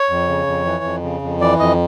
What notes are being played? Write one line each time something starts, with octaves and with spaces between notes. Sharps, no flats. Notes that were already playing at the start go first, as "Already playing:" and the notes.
Already playing: C#5
F2
C#3
F2
E3
F2
C#3
F2
E3 D5
F2 D#5